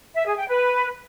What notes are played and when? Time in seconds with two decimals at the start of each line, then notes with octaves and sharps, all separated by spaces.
0.15 E5
0.26 G#4
0.38 G5
0.49 B4